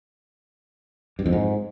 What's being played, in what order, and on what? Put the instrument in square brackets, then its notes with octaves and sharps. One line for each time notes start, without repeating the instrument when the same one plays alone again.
[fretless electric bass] G2
F2
G#2